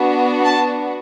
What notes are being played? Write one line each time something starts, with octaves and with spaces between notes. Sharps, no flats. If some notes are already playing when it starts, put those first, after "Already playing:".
Already playing: B3 D4 F#4
A5